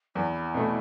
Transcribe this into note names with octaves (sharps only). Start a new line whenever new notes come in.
E2 E4
B2 A3